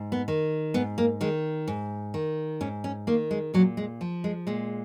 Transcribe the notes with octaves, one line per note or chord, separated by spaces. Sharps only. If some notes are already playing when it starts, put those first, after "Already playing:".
Already playing: G#2
B3
D#3
G#2 B3
A#3
D#3 G#3
G#2
D#3
G#2 C#4
C#4
D#3 A#3
G#3
A#2 F#3
G#3
F3
G#3
A#2 G#3